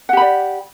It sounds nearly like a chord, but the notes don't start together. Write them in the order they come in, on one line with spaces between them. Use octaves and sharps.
F#5 G4 B5 D5